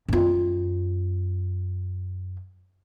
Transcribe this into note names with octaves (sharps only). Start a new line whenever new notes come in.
F#2 F4